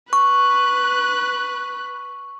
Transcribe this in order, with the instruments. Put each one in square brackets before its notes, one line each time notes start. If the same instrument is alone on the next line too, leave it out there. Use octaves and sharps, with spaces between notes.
[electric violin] B4 F#6 [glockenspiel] C#6